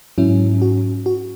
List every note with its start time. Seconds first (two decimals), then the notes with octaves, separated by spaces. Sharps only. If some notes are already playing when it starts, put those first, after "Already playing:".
0.18 G#2 F#3 C#4 E4
0.62 F#4
1.06 F#4